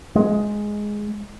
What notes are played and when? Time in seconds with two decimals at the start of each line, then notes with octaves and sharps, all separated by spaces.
0.15 G#3